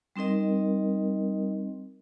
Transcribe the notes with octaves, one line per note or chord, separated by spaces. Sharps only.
G3 C4 D#4 A#4 D#5